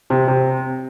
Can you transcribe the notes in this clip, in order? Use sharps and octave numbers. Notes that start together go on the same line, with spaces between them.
C3
C3